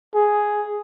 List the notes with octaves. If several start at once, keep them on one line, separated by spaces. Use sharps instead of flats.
G#4